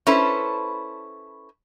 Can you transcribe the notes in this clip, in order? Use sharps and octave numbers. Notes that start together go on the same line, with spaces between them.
C#4 E4 A4 B4 C5